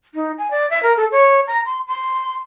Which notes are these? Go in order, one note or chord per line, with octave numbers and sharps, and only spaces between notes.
D#4
G#5
D5
E5
A#4
A4
C#5
A#5
C6
C6